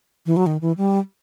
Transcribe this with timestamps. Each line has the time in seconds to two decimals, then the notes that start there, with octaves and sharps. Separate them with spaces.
0.26 E3
0.37 F#3
0.46 D#3
0.61 E3
0.77 G3